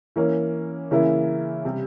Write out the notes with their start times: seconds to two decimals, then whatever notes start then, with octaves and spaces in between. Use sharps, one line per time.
0.16 E3 A#3 C#4
0.91 C#3 E3 A#3 E4
1.65 C3 G3